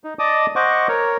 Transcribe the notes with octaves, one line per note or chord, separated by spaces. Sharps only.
D#4
D5 D#5 A5 D6 D#6
C5 D#5 F#5 C#6 D6
A#4 C#5